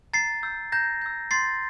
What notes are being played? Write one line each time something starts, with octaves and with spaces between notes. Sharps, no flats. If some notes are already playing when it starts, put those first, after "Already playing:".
A#5 A6 C7
E6 G6
A#5 G6 A#6
E6 G6
C6 A6 C7